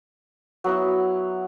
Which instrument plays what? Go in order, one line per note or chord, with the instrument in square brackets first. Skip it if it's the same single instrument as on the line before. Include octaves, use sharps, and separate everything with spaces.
[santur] F#3 B3 E4